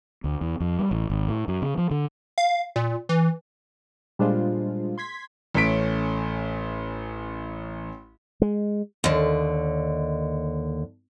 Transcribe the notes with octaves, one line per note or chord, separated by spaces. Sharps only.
D2
E2
F2
G3
A1
G#1
A2
F#2
C#3
F3
D3
F5
A#2
E3
A#2 G3 G#3 D4 F4 C5
C6 G#6 B6
A1 A3 C#4 B6 D7
G#3
D#2 D3